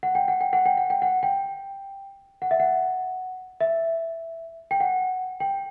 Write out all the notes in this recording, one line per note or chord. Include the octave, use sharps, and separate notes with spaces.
F#5
G5
F#5
G5
F#5
G5
F#5
G5
F#5
G5
F#5
E5
F#5
E5
G5
F#5
G5